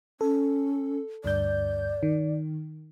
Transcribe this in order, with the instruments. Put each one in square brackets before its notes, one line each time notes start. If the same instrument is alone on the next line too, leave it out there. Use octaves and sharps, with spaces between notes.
[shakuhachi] C#4 [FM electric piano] A4
[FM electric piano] D2 G2 G6 [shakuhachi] D5
[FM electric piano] D#3